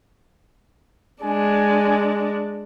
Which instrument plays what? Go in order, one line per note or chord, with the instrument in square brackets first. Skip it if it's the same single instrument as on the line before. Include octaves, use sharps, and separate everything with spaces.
[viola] G#3 D4 [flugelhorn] G#5